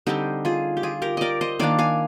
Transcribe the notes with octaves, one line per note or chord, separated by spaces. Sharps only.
D3 G3 C4 D#4 G4
F4 G#4
G4
F4 G#4
G4 A#4
A#4 D5 D#5
C5 D#5
D#3 A#3 D4 D5 F5
F5 G#5